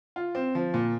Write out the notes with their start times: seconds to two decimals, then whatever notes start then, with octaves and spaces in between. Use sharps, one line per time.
0.16 F4
0.35 C4
0.55 F3
0.74 A#2